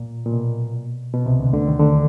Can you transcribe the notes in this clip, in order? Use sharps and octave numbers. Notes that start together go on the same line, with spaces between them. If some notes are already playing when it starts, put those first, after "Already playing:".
Already playing: A#2
A#2
B2
B2
C2 C3
D2 D3
D2 D3
D#2 D#3
D2 D3